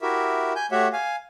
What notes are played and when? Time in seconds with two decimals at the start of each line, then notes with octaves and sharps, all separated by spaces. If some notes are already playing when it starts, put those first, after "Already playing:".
0.02 E4 F#4 G4 A#4 E5
0.56 G#5 G6
0.71 A3 F#4 G4 C#5 E5 F#5
0.93 F5 G#5